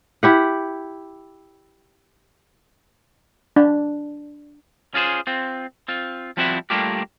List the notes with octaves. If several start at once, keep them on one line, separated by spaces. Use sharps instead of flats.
E4 G4 F#5
D4
C#4 F4 G#4 C5
C4 F4
C4 F4
F3 G3 C4 E4 F#4 E5
G3 A3 A#3 D4 F4 G4